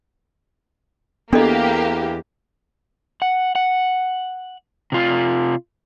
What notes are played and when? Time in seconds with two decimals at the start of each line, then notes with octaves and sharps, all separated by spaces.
1.33 E2 A#3 B3 D4 G4 A4 D#5
3.22 F#5
3.55 F#5
4.92 C3 F4